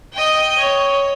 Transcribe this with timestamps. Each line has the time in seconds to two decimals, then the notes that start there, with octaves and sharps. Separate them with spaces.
0.13 D#5 G5
0.58 C#5